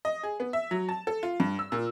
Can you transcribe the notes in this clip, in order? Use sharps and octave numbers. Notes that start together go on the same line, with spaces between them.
D#5
G#4
B3
E5
F#3
A5
A4
F4
G2
E6
A#2